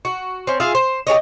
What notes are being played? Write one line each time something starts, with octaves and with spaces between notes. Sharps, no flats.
F#4
C4 C#4
F4 G#4 E5 F5
C5
G4 G#4 C#5 D#5